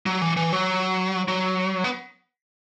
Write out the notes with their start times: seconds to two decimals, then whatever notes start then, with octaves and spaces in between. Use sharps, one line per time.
0.06 F#3
0.22 E3
0.37 E3
0.53 F#3
1.28 F#3
1.84 B3